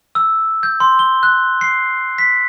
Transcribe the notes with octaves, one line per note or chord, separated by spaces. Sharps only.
E6
G6
C6
G7
F#6
C7
B6